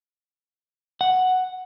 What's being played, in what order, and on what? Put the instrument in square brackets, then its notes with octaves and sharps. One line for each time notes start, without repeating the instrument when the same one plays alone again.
[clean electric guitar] F#5